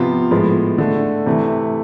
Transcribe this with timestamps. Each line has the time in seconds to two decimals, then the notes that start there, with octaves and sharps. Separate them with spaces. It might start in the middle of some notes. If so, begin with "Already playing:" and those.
Already playing: C3 F3 B3 F4
0.31 A2 F3 G#3 B3
0.78 D3 A3
1.26 C3 E3 A3